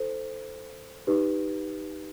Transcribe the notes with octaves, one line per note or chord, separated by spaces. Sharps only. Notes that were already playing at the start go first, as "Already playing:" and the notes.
Already playing: E4 A4 C5
D#4 G4 B4